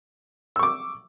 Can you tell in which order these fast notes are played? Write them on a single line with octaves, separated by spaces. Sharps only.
E6 C#6 D6